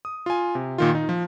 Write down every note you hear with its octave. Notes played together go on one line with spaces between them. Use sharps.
D#6
F4 G#5
C3
A#2 D#3 F4
D#4
F3